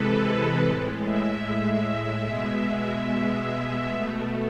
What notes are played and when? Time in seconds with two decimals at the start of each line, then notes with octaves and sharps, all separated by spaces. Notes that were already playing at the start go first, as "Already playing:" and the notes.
Already playing: C3 E3 G#3 A4 B4
0.21 B4
0.62 A2
0.67 G#3
1.02 E5
2.26 B2 G#3 E5
3.88 B2 A3